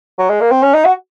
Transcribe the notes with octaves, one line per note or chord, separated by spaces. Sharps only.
F#3
G#3
A#3
C4
C#4
D#4
F#4